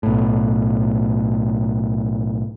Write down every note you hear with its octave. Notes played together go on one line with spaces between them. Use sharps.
B1 A2